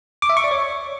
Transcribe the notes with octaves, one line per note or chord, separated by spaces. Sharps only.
D6
E5
C#6
D5
C#5